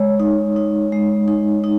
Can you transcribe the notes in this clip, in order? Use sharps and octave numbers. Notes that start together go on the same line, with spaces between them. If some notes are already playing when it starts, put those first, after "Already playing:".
Already playing: G#3 C#5
D#4
D#4
G#3
D#4
D#4